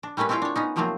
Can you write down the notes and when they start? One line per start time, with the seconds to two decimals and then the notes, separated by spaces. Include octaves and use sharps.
0.03 D4
0.17 G3 A3 A#3 C#4 B4
0.29 C4 C#4 E4 F4 F5 G5
0.42 D4 C#5
0.56 B3 C#4 D#4
0.76 C3 F3 F#3 A3 A#3 C4